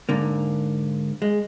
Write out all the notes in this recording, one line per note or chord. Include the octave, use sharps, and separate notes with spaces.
G#2 D3 A#3
G#3